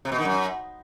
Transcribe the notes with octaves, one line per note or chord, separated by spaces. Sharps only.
C3
B2
D#3
F#2